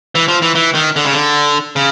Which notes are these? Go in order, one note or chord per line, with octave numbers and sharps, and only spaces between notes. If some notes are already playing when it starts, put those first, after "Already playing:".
E3
F3
E3
E3
D#3
D3
C#3
D3
C#3